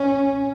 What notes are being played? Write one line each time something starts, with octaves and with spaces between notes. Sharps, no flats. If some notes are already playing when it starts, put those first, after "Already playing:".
Already playing: C#4